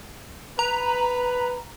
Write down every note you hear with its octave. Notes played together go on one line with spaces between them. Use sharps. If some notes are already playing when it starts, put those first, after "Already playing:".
B4 A#5